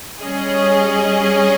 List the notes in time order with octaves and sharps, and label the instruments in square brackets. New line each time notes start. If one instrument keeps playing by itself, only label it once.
[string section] G3 C#4 G#4 D#5